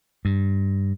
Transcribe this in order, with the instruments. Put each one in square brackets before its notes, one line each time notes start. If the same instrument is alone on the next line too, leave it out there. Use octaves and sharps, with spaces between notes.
[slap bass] G2